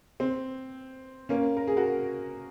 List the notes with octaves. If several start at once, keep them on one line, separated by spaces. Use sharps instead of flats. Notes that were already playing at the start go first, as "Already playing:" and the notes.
C4
A#3 C#4
A#4
G#4
F#4 A#4